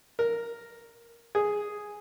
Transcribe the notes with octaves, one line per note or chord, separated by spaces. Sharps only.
A#4
G#4